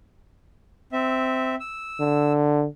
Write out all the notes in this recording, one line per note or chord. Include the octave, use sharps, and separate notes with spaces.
C4 E5
E6
D3